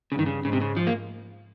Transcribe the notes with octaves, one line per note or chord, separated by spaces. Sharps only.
G2 C#3
D#3
C#3
G#2 C#3
C3
C#3
F3
A#3